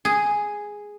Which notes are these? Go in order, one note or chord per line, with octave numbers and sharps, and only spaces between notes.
G#4